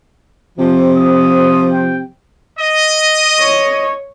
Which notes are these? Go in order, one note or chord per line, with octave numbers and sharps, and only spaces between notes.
C3 F3
D#6
G5
D#5
C#5